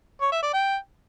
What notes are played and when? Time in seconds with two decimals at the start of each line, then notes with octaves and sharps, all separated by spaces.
0.21 C#5
0.32 E5
0.43 D5
0.53 G5